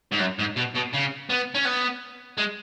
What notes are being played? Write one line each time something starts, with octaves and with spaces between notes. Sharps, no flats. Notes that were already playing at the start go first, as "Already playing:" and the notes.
G#2
F#2
G#2
B2
B2
C#3
B3
C#4
B3
G#3